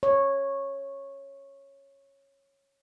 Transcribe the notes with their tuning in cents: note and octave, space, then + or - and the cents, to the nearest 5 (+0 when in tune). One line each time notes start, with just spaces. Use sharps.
C#5 -10